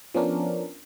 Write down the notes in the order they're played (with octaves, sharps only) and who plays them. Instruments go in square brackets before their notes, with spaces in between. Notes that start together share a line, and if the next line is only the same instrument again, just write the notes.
[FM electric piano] F3 B3 C#4 D4 A#4